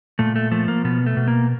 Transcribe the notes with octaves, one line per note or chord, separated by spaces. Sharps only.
A#2 A3
A3
F3 A3
A#3
B2 B3
A3
B2
A#3